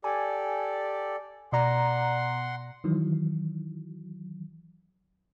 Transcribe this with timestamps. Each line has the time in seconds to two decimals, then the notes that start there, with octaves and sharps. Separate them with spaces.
0.04 G4 A4 D5 G#5
1.52 B2 D5 F#5 A#5 C6
2.84 D#3 E3 F#3